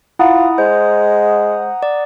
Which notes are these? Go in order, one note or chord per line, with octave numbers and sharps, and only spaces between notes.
E4 F4 F#5 A#5 D#6
G#3 C5
D5